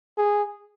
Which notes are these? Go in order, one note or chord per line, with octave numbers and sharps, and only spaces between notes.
G#4